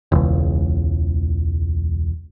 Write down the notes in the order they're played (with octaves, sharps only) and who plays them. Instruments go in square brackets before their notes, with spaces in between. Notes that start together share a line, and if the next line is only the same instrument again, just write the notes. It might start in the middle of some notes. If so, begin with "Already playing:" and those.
[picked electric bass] E1 C#2